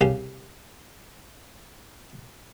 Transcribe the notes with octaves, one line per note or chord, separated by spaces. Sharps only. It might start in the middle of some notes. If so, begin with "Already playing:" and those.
C2 C#3 G4 F5